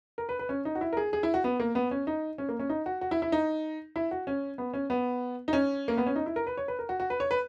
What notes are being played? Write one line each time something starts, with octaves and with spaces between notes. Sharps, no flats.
A#4
B4
B4
C#4
D#4
F#4
E4
A#4
G#4
G#4
E4
F#4
B3
A#3
B3
C#4
D#4
C#4
A#3
C#4
D#4
F#4
F#4
E4
E4
D#4
E4
F#4
C#4
B3
C#4
B3
D#4
C#4
A#3
B3
C#4
D#4
E4
A#4
B4
C#5
B4
A#4
F#4
F#4
B4
C#5
B4